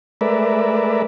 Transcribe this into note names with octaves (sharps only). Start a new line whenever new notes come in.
G#3 A3 A#4 B4 D5 E5